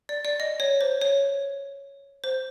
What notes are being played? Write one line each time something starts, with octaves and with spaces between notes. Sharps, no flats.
D5
D5
D#5
C#5
C5
C#5
C5